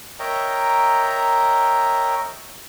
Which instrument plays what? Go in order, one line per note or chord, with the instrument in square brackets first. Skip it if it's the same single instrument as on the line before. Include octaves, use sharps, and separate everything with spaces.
[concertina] A#4 C#5 D#5 E5 G5 A#5